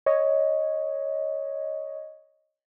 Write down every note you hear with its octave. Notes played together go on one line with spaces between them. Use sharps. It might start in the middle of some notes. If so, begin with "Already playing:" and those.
C#5 D#5